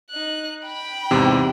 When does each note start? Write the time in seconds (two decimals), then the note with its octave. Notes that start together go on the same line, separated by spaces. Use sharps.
0.10 D#4 F#6
0.64 G5 B5
1.11 E2 G#2 C3